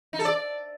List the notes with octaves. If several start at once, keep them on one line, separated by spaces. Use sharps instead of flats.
D#4
A4
D5